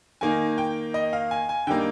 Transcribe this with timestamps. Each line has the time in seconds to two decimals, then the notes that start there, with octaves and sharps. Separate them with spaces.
0.21 D#3 A#3 D#4 G#5
0.58 G5
0.94 D#5
1.13 F5
1.31 G#5
1.49 G#5
1.67 D3 G3 A#3 D#4 G5